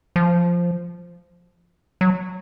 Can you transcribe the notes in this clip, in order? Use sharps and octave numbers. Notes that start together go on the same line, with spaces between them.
F3
F#3